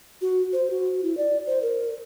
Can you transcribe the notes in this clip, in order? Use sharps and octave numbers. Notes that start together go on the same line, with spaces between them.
F#4
C5
F#4
E4
D5
C5
A#4